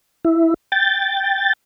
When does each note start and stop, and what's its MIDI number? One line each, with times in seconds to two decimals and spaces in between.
0.25 0.54 64
0.72 1.53 79
0.72 1.53 93